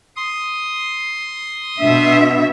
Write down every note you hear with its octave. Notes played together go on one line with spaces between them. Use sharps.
C6 D#6
B2 D4 E5